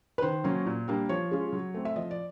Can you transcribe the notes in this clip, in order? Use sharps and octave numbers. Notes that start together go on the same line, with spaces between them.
B4
D#3 C5
F#3 A#3 C#4
A#2
G3 A#3 D4
F3 C#5
G#3 C#4 F4
F#3
A3 C4
E5
F3 D#5
D5